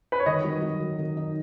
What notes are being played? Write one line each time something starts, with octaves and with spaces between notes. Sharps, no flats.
B4
C#5
D#3 D#5
F#3
F#3
D#3
D#3
D#4